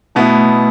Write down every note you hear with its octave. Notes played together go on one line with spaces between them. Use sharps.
B2 A3 B3 E4